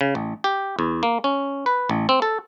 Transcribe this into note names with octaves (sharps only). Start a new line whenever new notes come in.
C#3
A1
G4
E2
A#3
C#4
B4
A1
C4
A4